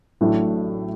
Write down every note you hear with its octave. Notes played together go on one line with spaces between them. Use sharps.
A1 A2 F#3 A3 D4